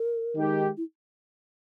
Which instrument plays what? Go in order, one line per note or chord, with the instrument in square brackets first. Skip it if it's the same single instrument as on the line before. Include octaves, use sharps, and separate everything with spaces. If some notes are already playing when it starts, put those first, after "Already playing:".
Already playing: [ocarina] A#4
[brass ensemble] D#3 G#3 D#4 G4
[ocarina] E4